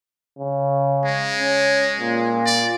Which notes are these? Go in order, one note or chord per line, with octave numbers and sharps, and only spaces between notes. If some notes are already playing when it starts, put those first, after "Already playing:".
C#3
G#3
C#4
A#2
D5